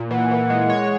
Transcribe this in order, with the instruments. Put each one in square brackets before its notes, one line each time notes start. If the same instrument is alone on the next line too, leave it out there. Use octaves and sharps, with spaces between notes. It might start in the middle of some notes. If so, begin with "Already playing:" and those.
Already playing: [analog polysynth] A#2
[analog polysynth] E3 [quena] F#5
[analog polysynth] E3
G#3
C#5